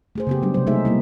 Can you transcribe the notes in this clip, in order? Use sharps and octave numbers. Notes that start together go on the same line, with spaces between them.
A3 G#4 C5
C#3 B3 G4
F#3 G3 B3 D4
C3 C5
G#3 A3 D#4 G#4 C5 E5
G3 A#3 E4